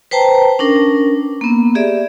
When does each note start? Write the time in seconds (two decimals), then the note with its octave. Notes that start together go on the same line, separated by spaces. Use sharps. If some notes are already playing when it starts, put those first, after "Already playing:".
0.11 B4 C5 G5 A5 A#5
0.59 C#4 D4 A#4
1.41 A#3 B3
1.75 G4 G#4 D5 E5